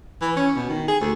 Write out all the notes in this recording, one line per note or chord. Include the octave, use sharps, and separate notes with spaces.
E3
C#4
B2
D#3
G#4
D2